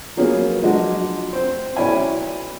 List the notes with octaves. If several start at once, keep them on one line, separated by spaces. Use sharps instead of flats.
F3 F#3 A#3 B3 C#4 G#4
F3 F#3 G#3 D4 F#4
C4
B1 C#4 E4 D5 G#5 B5